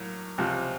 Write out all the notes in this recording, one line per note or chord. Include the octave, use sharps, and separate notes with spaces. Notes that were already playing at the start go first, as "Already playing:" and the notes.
Already playing: A2 F#3 A#3
C#2 C3 F3